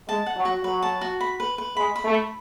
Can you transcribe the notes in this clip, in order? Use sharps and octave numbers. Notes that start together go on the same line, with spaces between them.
G#3 A5
F#5
F#3
F#4
F#3 B4
A5
F#4
B5
B4
B4
G#3 B5
B5
A3
B5